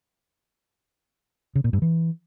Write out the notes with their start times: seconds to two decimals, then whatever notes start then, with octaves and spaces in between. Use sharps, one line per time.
1.55 C#3
1.64 A#2
1.73 G2
1.82 E3